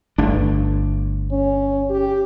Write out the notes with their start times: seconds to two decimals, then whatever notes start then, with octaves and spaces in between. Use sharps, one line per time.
0.18 G1 A3 D4
1.31 C#4
1.90 G4